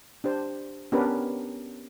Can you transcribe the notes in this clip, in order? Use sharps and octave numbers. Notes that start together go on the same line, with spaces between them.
D4 G4 C5
B3 C#4 D4 G4 A#4 B4